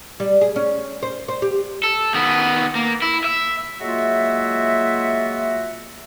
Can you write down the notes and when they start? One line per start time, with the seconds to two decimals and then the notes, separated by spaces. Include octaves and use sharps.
0.20 G3
0.41 G#4
0.56 C#4
1.03 C5
1.28 C5
1.42 G4
1.83 A4
2.15 D#3 B3
2.75 A#3
3.02 E4
3.24 E5
3.81 F#3 G#3 A#3 F4 F#4 E5